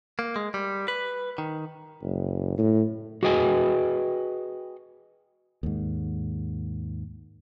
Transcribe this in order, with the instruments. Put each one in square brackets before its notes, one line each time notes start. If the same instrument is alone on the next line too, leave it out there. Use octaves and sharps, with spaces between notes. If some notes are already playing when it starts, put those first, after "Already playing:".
[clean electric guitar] A#3
G#3
G3
B4
D#3
[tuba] F#1
A2
[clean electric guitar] F#4 G#4 B4 D#5 G5 G#5
[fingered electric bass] D#2 G#2